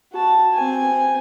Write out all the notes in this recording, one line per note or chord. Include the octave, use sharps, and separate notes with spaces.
F#4 A5
C4 G#5